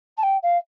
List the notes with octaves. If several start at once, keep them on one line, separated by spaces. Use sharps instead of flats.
A5
G5
F5